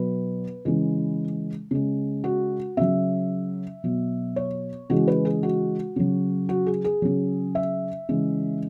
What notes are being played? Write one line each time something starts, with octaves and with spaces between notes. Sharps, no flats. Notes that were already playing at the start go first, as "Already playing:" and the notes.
Already playing: B2 F#3 B4
C#3 E3 G#3
C#3 G#3
F#4
C#3 F#3 E5
B2 F#3
C#5
C#3 E3 G#3 F#4
B4
G#4
F#4
C#3 F#3
F#4
G#4
G#4
C#3 F#3
E5
C#3 E3 G#3